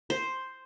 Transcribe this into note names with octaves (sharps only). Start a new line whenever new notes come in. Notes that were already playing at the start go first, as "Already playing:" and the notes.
C5